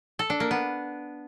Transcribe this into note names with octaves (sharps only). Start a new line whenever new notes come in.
A4
D4
A#3
B3